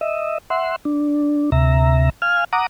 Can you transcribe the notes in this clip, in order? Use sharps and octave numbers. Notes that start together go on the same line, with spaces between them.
D#5 E5
E5 F#5 C6
D4
D2 C3 E5 A#5
F5 G#5 F6
F#5 A#5 D6 D#6